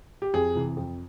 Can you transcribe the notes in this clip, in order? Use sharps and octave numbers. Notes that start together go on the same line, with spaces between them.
G4
F2 G#4
C3 E3
F2